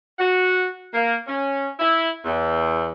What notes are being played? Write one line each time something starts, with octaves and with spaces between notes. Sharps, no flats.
F#4
A#3
C#4
E4
E2